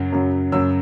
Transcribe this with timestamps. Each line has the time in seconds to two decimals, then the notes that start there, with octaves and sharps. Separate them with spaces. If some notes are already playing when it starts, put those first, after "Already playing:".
Already playing: F#2 C#3 F#3
0.12 F#2 C#3 F#3
0.52 F#2 C#3 F#3 E6